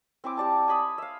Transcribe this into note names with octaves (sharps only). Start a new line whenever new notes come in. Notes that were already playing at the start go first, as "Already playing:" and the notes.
C4 E4 G#5 D6
G4 D5 A5
G#5 B5 D#6
E5 F5